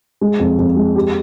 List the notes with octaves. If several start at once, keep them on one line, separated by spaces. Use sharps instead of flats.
G#3
F2
F2
G#3
G4